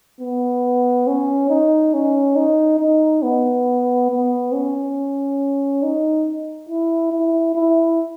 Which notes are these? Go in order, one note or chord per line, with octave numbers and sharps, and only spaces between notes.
B3
C#4
D#4
C#4
D#4
D#4
B3
B3
C#4
D#4
E4
E4
E4